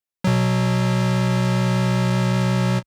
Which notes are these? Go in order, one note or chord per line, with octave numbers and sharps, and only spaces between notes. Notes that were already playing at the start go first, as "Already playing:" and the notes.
B2 F#3